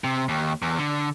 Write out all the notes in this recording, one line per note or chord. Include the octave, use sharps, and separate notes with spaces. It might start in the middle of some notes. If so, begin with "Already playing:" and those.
C3
D#2
E2
D3